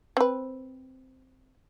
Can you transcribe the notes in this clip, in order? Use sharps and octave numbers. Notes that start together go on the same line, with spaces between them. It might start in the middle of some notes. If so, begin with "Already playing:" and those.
C4 B4